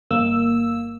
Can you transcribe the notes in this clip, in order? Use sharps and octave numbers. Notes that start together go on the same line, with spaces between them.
G1 A#3 E6